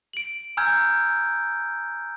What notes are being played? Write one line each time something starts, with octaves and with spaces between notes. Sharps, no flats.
D7 F#7
G#5 A#5 E6 F6 G6 G#6